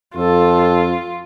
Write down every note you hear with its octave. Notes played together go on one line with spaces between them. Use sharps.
F2 F4 A4